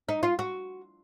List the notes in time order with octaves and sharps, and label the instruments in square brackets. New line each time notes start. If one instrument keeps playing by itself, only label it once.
[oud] D#4
F4
F#4